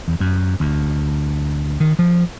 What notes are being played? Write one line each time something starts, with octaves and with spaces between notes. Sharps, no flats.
E2
F#2
D2
D#3
F3